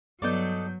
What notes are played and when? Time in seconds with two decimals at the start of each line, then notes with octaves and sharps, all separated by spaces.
0.22 G2 F#3 B3 D#4 A4 D5 G6